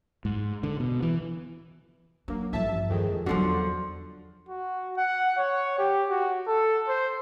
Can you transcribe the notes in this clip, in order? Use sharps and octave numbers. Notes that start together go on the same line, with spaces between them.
G#2
D3
B2
E3
F#3 A#3 D4
A1 G2 F3 E5 A5
F2 D#3 G#3
E2 D3 F3 F#3 F#4
F#4
F#5
C#5
G4
F#4
A4
C5